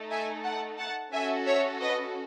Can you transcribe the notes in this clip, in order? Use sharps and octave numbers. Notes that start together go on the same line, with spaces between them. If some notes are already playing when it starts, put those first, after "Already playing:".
Already playing: A3 D#4 A4
E5 G#5
F#5 A5
F#5 A5
C#4 F#4 A4 E5 G#5
C#5 E5
B4 D#5